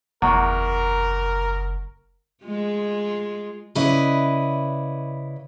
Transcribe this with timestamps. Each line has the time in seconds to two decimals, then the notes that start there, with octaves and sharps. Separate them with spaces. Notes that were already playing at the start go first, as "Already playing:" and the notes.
0.22 F#1 E2 A#4 F#5 A#5 C#6
2.44 G#3 F4
3.75 C#3 E4 B4 D5 D#5